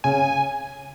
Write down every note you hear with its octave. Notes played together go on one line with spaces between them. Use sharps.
C#3 G#5